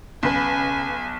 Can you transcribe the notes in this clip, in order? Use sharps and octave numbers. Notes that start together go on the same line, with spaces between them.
B1 C#3 C#4 B4 G#5